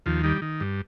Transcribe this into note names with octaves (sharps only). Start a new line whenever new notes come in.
D#2 F3
D#3 G3
D#3
G2